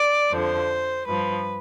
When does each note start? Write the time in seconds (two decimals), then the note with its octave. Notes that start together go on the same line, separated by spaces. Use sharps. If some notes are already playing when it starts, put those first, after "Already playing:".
Already playing: D5
0.31 F2 D3 F3 C5
1.06 G2 F3 B4